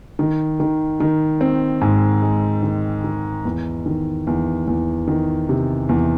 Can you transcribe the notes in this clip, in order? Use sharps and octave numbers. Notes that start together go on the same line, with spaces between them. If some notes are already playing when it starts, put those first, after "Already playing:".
D#3
D#3
D#3
C4
G#2
G#3
D#3
D#3
E2
D#3
E2
E2
D#3
C3
E2